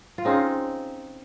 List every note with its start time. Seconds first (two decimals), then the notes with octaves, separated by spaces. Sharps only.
0.18 F4
0.25 C4 C#4 D#4 G#4 C5 F5